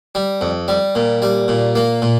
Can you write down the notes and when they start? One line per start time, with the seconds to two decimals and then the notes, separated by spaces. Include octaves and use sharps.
0.15 G3
0.41 F2
0.68 G3
0.95 A#2
1.22 G3
1.48 A#2
1.75 A#3
2.02 A#2